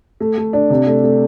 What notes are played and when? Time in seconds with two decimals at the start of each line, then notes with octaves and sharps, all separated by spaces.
0.20 A3
0.38 A3
0.53 D4
0.70 C3
0.87 A3
1.04 A3